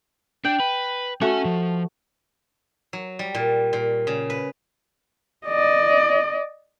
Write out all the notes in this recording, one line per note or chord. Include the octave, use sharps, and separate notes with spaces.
D4 G5
B4
A3 C#4 F#4 G#5
F3
F#3
G3
A#2
A#2
C#3
B4
D5 D#5